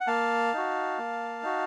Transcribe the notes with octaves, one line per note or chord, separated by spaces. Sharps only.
F#5
A#3 F5 A5
D#4 F#4
A#3
D#4 F#4